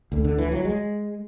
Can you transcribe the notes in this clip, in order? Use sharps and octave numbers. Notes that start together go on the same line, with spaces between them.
D2 D3
D3
E3
F#3
G#3